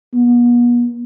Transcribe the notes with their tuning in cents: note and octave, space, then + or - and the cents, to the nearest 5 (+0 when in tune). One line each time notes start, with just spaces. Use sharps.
B3 -40